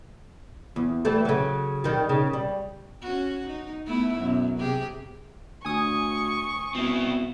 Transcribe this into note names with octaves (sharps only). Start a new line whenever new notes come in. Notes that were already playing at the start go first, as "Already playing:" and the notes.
E2
E3 G3 A3
C#3 F#3
D#3 G3
C#3
G3
C#4 F#4
D#4
A3 B3 E4
F#2 B2
C3 G4 G#4
D2 G#5 C#6 D#6
B2 C4 E4